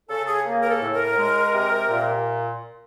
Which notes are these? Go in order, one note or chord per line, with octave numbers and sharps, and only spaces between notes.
C#3 A4
G#4
A#3
A#4
A4
A2
A#4
G#3
C3
A#2